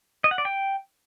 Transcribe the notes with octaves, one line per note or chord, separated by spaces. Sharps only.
D#5
F#5
D5
G5